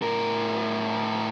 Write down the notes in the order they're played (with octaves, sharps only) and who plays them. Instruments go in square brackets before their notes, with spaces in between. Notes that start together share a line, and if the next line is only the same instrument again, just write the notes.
[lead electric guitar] A2 A#4